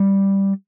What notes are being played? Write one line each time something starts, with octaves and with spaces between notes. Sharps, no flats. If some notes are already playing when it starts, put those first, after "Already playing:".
Already playing: G3